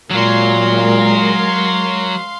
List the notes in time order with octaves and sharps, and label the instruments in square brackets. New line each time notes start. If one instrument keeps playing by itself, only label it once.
[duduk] A#2 [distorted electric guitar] F#3 [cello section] G#3 A#4 [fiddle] F5 C6